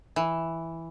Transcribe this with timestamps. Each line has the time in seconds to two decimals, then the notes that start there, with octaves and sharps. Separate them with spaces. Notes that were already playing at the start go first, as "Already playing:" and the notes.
0.16 E3